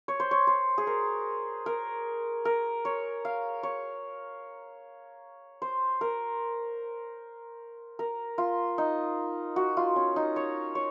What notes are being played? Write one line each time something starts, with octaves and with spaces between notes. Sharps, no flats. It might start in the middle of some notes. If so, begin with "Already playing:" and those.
C#5
C5
C#5
C5
G#4
A#4
A#4
A#4
C#5
F5
C#5
C5
A#4
A#4
F4
D#4
F#4
F4
C#4
D#4
C#5
C#5